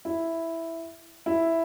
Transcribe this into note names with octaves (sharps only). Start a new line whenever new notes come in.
E4
E4